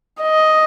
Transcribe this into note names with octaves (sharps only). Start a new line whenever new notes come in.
D#5